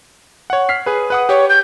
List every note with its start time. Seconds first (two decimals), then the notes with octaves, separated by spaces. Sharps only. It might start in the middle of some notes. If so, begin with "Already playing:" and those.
0.50 C#5 F#5
0.69 F6 B6 C7
0.86 G#4 B4
1.10 B4 F#5 D#6
1.29 G4 C#5
1.49 G6